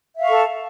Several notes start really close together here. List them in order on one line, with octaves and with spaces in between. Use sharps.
E5 F5 C#6 A4